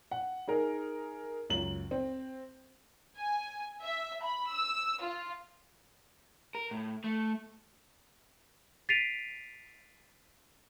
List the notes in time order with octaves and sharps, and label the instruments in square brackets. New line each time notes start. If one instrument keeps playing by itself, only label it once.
[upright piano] F#5
D#4 G#4 A#4
C#2 F#2 F#7
C4
[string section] G#5
E5
B5
E6
F4
[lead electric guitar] A#4
A2
A3
[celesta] A6 B6 C7 D7 D#7 F7